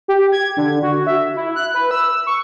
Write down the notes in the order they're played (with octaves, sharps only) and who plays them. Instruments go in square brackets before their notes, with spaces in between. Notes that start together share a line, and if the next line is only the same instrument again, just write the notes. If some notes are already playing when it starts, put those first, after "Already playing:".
[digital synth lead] G4
G#6
D3
F#4
E5
E4
F#6
B4
E6
C#6